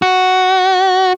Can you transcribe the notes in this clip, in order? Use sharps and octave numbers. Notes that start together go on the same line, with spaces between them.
F#4